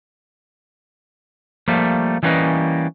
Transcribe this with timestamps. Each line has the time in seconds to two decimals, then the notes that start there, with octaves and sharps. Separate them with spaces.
1.68 F3 G3 A3 A#3
2.23 E3 G3 A#3 C#4 B4 D#5